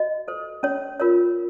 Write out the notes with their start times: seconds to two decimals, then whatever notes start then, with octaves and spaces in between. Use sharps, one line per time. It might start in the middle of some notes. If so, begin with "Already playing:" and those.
Already playing: F#4 D#5
0.28 A4 C5
0.63 C#4 C#5
1.00 F4 A#4 C#5